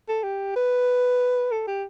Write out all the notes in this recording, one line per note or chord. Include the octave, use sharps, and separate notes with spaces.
A4
G4
B4
A4
G4